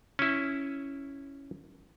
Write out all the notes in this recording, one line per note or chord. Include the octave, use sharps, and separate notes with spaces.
C#4 E4